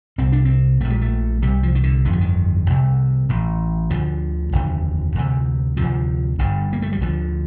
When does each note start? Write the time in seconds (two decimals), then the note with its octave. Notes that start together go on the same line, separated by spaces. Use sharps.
0.18 C2 C3 C4
0.32 D4
0.45 C4
0.80 A#1 A#2 A3
0.90 G3
1.01 A3
1.42 C2 C3 G3
1.63 F3
1.75 D#3
1.83 D3
2.05 G1 F2 D3 D#3
2.13 F3
2.21 D#3
2.67 C2 C3
3.29 A1 A2
3.90 D2 D3 F3
4.52 F1 D#2 D3
5.15 D2 C3
5.77 D2 C3 F3
6.39 G1 G2 D3
6.73 A#3
6.82 A3
6.92 G3
7.01 D2 D3 F3